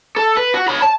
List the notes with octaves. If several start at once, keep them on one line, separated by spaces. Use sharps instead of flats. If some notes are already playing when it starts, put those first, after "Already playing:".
A4
B4
F#4
C#5 B5
A5